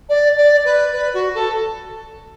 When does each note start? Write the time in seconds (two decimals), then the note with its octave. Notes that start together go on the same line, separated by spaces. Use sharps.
0.09 D5
0.37 D5
0.65 B4
0.93 B4
1.14 F#4
1.35 A4